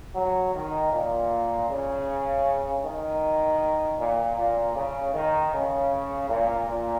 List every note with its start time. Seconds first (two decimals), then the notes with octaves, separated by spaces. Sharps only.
0.15 F#3
0.54 D#3
0.93 A#2
1.70 C#3
2.85 D#3
3.99 A#2
4.37 A#2
4.76 C#3
5.14 D#3
5.53 C#3
6.30 A#2
6.68 A#2